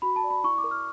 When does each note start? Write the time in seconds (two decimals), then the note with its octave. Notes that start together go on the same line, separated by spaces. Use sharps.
0.02 F#4 B5
0.16 A5
0.24 D5
0.30 B5
0.44 E4 C#6
0.58 D6
0.64 A#4
0.71 F6